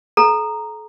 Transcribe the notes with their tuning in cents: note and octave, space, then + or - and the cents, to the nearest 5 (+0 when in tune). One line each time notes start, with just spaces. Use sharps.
A4 -40 A#5 +0